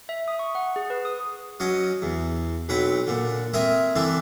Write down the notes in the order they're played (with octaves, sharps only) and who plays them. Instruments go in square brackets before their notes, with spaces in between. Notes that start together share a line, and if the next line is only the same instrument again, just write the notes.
[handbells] E5
D#6
C#6
F#5
G#4
B4
D#6
[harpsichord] F#3 C#4 D#5
E2
B1 F#3 C4 B4
A#2 D3
C4 A#4 E5 G#5 D#6
D3 E3 C4 D4 E4